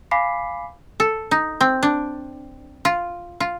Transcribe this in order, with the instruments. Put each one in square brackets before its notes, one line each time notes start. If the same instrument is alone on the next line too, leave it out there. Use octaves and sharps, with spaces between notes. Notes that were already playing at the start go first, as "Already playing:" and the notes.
[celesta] F5 G#5 B5 D6 B6 C7
[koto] A4
D#4
C4
D4
F4
F4